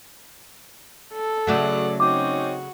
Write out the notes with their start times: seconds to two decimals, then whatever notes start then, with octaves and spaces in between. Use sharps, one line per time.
1.14 A4
1.47 C#3 F#3 A3 F#4 D5 F#5
2.00 C4 C#4 D#4 F#4 D6